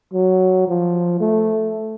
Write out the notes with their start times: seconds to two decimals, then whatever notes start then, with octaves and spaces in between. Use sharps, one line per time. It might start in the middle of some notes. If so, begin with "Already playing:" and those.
0.13 F#3
0.68 F3
1.20 A3